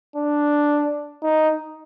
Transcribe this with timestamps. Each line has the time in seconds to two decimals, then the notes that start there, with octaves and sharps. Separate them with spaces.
0.16 D4
1.23 D#4